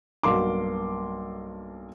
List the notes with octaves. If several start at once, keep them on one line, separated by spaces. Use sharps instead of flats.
B1 G2 A#3 C6 D6